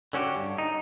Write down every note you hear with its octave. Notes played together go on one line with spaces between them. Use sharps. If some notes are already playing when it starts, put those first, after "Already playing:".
D3 C#4 F#4 G4
G2
D#4